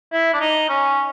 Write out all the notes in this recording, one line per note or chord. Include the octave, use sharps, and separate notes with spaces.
E4
D4
D#4
C#4